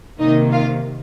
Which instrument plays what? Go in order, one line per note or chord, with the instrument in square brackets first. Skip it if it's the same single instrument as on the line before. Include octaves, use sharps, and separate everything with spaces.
[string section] C3 D#3 A#3 D#4 D#5
F4 F5